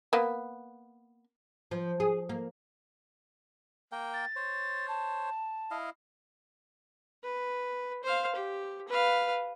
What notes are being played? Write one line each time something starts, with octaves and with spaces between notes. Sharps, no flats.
A#3 B3
F3
G#4
A#3
A#3 A#4 G5
A6
C5 C#5
A5
E4 D#5 F5
B4
C5 F5
G4
B4 F5